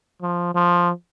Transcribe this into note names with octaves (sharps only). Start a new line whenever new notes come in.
F3
F3